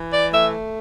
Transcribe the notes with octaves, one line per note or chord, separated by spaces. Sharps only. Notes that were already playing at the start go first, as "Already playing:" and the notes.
Already playing: E3
D5
A3 E5